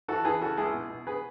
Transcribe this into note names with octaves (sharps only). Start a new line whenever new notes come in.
E3 F#4 A4
E3 G#4 B4
C#3 F#4 A4
C#2 E4 G#4
B2
B2
G#4 B4